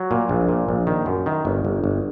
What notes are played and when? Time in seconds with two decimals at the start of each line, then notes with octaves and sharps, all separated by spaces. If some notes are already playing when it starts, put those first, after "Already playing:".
Already playing: F#3
0.11 A#2
0.29 A#1
0.49 A#2
0.69 A#1
0.87 D#3
1.06 F#2
1.26 D#3
1.45 G1
1.65 G1
1.84 G1